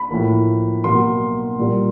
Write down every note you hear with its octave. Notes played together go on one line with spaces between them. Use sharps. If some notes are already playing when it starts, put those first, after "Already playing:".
Already playing: B5
A2 F3 A#3
B2 F#3 A#3 C6
A#2 G3 A#3